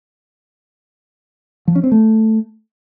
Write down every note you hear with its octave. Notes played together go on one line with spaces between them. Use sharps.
F3
C#4
C4
A3